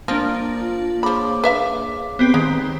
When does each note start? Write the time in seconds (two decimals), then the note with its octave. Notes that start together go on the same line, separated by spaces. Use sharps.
0.08 F3 A#3 D4
0.60 F4
1.03 F3 G#4 C#5 B5 D6
1.44 B4 E5 F5
2.19 B3 C4 G4
2.34 D#3 G#3